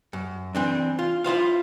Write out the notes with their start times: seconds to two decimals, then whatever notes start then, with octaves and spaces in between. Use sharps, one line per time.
0.13 F#2
0.55 E3 C4 D4
0.99 F4
1.24 E4 F4 C5 F5